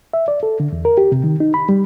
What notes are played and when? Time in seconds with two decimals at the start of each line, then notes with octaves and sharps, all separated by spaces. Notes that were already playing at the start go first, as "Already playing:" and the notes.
0.14 E5
0.28 D5
0.43 A4
0.60 D3
0.72 E2
0.85 A#4
0.98 G4
1.12 C3
1.24 D#3
1.40 D#4
1.54 B5
1.69 G3